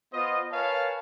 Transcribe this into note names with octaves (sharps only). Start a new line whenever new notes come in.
B3 F4 C5 D#5
A#4 B4 C#5 F5 G#5 A5